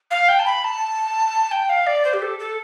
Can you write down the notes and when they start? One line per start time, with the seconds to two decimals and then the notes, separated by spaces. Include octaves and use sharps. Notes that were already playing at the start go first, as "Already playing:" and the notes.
0.10 F5
0.28 G5
0.39 A5
0.45 B5
0.64 A5
1.51 G5
1.69 F5
1.86 D5
2.04 C5
2.13 G4
2.22 A4
2.39 A4